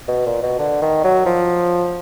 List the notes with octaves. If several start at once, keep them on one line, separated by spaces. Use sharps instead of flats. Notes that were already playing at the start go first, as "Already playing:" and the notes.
B2
A#2
B2
D3
D#3
F#3
F3